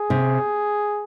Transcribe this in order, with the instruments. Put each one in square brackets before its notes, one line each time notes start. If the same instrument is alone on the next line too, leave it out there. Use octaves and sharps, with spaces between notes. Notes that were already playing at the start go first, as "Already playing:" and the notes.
Already playing: [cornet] G#4
[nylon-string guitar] C3